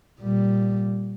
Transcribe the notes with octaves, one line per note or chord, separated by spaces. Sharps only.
A#2 G3